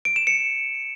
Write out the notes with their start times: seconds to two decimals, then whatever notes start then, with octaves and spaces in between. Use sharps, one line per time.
0.05 D7
0.16 E7
0.27 C#7